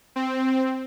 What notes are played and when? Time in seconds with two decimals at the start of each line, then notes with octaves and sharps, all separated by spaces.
0.16 C4